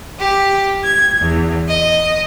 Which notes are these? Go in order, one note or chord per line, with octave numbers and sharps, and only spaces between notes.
G4
G#6
E2
D#5